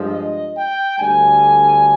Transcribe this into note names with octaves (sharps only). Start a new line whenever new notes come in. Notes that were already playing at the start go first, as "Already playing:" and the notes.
Already playing: G2 F3 G#3
D#5
G5
D2 D3 G3 G#5